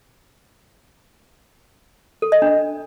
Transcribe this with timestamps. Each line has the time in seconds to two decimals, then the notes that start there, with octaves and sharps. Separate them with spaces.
2.22 A4
2.32 D#5
2.42 D4